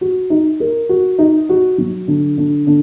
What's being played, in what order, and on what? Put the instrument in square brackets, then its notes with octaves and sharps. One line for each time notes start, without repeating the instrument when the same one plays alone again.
[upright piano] F#4
D#4
A#4
F#4
D#4
F#4
F#3
D3
D3
D3